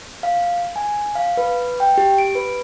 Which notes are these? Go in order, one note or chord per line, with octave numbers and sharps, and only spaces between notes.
F5
G#5
F5
B4
G5
G4
D7
B4